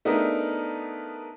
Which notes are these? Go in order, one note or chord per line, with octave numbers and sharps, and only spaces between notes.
A3 B3 D4 D#4 G#4 A#4